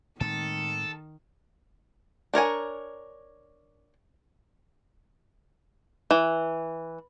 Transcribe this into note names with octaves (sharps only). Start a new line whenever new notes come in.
A2 D#3 G#3 C4 A4
D4 A#4 C#5 G#5
E3